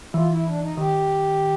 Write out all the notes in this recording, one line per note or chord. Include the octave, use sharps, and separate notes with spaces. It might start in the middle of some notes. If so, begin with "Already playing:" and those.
E3 F4
E4
D4
D#4
D#3 G4